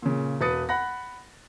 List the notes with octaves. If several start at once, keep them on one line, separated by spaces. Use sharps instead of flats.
A#2 C#3
E1 B4 D#6 A6 C#7
F#5 B5 F#6 A#6